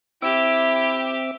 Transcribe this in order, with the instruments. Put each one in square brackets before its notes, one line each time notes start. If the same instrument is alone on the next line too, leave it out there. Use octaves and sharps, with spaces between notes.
[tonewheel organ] C4 E5 D6 [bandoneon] E4 [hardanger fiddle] G4 [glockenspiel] E6 D7 E7